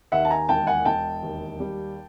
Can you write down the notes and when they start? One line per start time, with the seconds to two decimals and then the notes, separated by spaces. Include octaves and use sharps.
0.12 D#2 E5 F#5
0.25 A5
0.30 G#5 A#5
0.49 E1 G5 A5
0.67 F#5 G#5
0.85 E1 G5 A5
1.22 D#2
1.60 G3